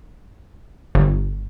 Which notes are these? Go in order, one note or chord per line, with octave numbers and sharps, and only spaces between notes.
G1